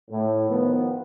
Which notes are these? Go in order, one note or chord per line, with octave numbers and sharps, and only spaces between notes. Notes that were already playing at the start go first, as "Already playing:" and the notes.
A2
D#3 F3 B3